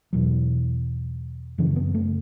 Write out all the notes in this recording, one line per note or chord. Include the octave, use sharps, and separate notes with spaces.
E2 B2 F#3
F#2 C#3 E3
B3
A3